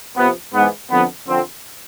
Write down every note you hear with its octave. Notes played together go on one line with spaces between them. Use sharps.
F2 C3 F3 B3
G#2 E3 B3
F2 D3 F3 B3
F2 D3 F3 C4